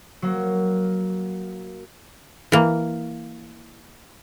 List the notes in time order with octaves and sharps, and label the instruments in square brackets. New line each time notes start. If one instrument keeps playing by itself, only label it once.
[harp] F#3 A#3
[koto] E3 A#3